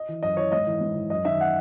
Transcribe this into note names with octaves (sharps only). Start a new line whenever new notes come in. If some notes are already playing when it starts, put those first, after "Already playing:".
Already playing: D#5
E3
F#2 D#5
E3 C#5
G#2 D#5
E3
G#2
E3
F#2 D#5
D#3 E5
F#5